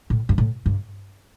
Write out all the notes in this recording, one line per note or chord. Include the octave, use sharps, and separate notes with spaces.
A2
G2
A2
G2